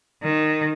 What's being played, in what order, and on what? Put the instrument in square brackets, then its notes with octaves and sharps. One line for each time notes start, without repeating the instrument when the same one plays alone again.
[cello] D#3